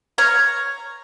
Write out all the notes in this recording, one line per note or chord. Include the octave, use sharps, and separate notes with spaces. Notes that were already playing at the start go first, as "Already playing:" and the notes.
C#5 A#5 F6